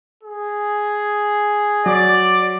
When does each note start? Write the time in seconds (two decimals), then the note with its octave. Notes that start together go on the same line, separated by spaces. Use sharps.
0.23 G#4
1.86 F#3 D5